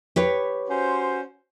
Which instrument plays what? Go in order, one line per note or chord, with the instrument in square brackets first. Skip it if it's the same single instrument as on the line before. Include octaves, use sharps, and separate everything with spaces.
[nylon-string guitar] G4 B4 C#5
[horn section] C#4 F#4 C5